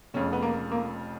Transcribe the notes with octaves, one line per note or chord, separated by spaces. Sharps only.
F1 F2 C#3 C#4
B3
A#3
A#3